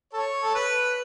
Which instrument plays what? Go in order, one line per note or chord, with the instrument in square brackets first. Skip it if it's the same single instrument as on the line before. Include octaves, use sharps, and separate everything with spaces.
[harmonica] A4 C#5
A4
B4